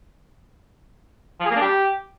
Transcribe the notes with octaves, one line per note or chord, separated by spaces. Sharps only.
F3
G#4
A#3
D4
G4